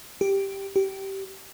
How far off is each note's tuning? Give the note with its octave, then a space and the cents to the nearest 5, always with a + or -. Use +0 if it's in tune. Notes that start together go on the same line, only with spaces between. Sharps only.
G4 +0
G4 -20